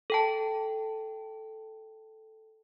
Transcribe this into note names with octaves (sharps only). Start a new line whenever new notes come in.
A4 G5 A5